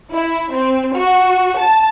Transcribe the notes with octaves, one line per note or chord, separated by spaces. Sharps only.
E4
C4
F#4
A5